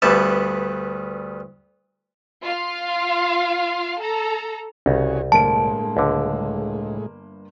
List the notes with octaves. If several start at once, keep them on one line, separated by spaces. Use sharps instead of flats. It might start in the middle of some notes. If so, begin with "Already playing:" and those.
D2 G2 G3 B3 E5 A5
F4 F5
A4 A#5
C2 C#3 F#4 G#4 C#5
G1 A2 G#3 A#3 A5 D7
C#2 D3